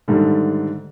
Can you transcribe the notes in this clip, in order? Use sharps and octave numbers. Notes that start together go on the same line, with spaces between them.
G#2 D3 D#3 G3 A3